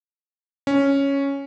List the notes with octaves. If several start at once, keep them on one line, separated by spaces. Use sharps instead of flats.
C#4